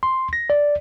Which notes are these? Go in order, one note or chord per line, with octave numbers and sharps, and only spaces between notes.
C6
A#6
D5